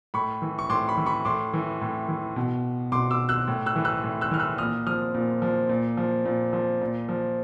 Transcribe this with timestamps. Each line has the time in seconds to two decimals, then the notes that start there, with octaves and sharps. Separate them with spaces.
0.14 A2 B5 C#6
0.42 E3
0.59 C#6
0.69 A2 C6 D6
0.88 B5 C#6
0.97 E3
1.06 B5 C#6
1.25 A2 C6 D6
1.53 E3
1.81 A2
2.08 E3
2.36 B2
2.92 B2 C6 D6
3.11 D6 E6
3.29 E6 F#6
3.48 A2
3.66 E6 F#6
3.76 E3
3.85 E6 F#6
4.03 A2
4.21 E6 F#6
4.31 E3 F6
4.40 E6 F#6
4.58 A#2 D#6 F6
4.87 F3 D#6 F6
5.14 A#2
5.42 F3
5.69 A#2
5.97 F3
6.25 A#2
6.53 F3
6.81 A#2
7.09 F3